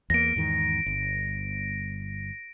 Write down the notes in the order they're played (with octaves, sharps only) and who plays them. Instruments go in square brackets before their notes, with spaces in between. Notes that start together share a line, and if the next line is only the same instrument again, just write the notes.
[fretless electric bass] E2 A#3 [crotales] A#6 D7
[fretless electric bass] E2 G#2 D#3
G1